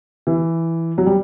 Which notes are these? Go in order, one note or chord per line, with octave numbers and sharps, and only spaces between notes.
E3
F#3
G3